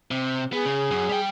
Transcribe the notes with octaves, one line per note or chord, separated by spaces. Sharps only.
C3
B3 G#4
C#3
F#2
G3 G5